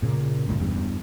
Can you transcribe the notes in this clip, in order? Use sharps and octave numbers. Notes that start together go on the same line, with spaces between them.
A#2 C#3 A#3
G1 C#2 A2
E2 G2